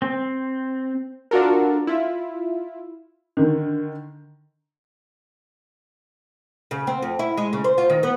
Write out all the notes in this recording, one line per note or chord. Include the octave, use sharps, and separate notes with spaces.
C4
D4 F4 F#4 A4 A#4
E4 F4
D3 D#3
C#3
C4
F2
E4
G#3
C#3
C5
F4
D#3
B3